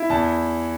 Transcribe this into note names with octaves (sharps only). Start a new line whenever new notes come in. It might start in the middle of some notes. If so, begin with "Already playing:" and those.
Already playing: E4
E2 A5